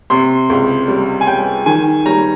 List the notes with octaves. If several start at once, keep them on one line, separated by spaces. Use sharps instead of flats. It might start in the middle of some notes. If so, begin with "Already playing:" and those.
C3 C6
C#2
G3
G#5
G3 G5
D#3 G#5
G3 A#5